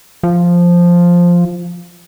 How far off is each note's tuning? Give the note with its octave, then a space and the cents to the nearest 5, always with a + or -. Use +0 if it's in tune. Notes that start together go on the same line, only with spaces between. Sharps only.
F3 +0